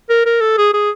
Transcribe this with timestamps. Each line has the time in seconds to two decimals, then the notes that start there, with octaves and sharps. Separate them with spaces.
0.10 A#4
0.26 A#4
0.41 A4
0.58 G#4
0.74 G#4